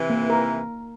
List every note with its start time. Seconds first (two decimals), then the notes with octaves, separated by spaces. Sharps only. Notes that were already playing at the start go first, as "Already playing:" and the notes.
Already playing: C3 E3
0.10 A#3
0.30 A#4